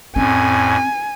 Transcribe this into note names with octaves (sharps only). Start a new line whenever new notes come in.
F2 A2 C4 C#4 G#5